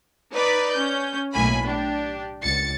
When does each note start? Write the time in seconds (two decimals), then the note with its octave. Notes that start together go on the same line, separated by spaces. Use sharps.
0.32 D#4 B4 D5 B5
0.73 C#4 G6
1.33 B1 A2 A#3 G#5 B5
1.64 D4 G4
2.43 C#2 A6 C#7